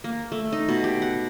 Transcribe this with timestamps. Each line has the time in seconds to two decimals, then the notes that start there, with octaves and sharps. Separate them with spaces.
0.04 A#3
0.32 A3
0.53 D#4
0.69 B2
0.84 G4
1.02 F#5